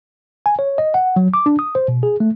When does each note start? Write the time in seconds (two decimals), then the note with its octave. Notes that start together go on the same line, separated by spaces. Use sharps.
0.46 G#5
0.59 C#5
0.78 D#5
0.94 F#5
1.16 F#3
1.34 D6
1.46 D4
1.59 D#6
1.75 C5
1.88 B2
2.03 G#4
2.20 A3